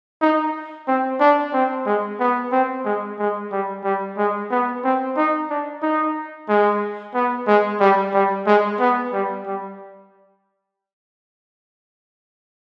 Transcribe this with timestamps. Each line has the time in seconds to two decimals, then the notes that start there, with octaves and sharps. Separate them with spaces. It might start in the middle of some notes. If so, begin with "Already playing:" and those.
0.22 D#4
0.88 C4
1.20 D4
1.53 C4
1.86 G#3
2.20 B3
2.52 C4
2.85 G#3
3.19 G#3
3.52 G3
3.84 G3
4.18 G#3
4.51 B3
4.84 C4
5.17 D#4
5.50 D4
5.83 D#4
6.49 G#3
7.15 B3
7.48 G#3
7.80 G3
8.14 G3
8.47 G#3
8.80 B3
9.13 G3
9.46 G3